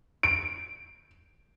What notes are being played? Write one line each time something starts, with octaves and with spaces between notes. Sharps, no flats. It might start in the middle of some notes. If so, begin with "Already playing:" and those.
D7